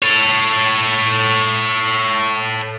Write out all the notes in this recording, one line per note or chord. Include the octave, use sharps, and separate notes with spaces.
A4 C#5